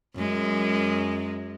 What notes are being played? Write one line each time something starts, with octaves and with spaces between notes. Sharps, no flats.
F#2 G#3